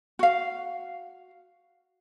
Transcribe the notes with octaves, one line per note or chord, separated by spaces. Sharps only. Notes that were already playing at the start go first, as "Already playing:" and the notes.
F#4 F5